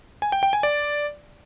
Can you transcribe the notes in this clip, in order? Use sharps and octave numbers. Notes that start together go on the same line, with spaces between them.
G#5
G5
G5
G#5
D5